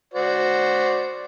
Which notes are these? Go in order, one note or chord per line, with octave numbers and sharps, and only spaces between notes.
F#4 C5 D5